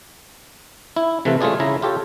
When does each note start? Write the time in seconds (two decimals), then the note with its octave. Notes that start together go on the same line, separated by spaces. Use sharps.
0.96 E4
1.25 C3 E3 A3 F4 A4 B4
1.41 A3 C#4 F4 G#4 D5
1.60 C#3 E4 A#5
1.82 F4 G4 A4 C#5